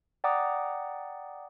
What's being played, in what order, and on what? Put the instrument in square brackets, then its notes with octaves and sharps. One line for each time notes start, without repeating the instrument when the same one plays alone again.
[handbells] D5 F#5 G5 A#5 D6 D#6